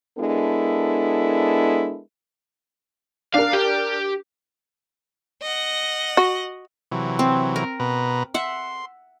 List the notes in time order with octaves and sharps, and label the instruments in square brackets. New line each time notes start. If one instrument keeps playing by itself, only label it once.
[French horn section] G#3 B3 D4 E4 A4 A#4
[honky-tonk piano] D4 A#4 [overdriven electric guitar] F5
[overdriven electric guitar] G4
[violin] D#5 F#5
[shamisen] F#4
[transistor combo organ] C3 E3 F#3
[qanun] C4
A#4
[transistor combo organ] B2 B4 A#5
[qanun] E5 F#5 [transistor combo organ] C6